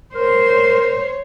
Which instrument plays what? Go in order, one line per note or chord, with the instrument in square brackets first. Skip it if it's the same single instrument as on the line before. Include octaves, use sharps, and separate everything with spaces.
[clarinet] A#4 [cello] C5 [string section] C#5